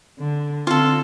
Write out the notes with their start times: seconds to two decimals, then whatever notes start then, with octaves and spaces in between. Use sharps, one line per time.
0.19 D3
0.67 D3 C4 F4 A4